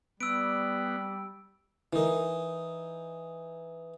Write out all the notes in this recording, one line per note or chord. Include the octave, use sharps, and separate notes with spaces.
G3 B3 E6 D7
E3 D#4 E4 A#4